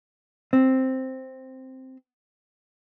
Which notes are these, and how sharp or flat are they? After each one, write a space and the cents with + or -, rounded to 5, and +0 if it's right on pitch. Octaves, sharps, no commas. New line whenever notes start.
C4 +0